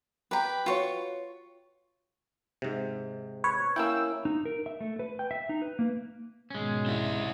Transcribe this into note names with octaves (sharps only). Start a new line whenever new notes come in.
G4 B4 G5 A#5
F4 F#4 B4 C#5 C#6
G#2 C3
B4 C#5
A#3 C#4 E4 G5 E6
D#4
A#4
E5
A3
B4
G5
E5
D#4
B4
A#3
G#2 B2 D#3 G#3 C#4
C4 E4 D5 E5 G#5